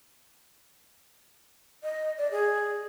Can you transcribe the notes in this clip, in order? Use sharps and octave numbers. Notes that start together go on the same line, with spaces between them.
D#5
D5
G#4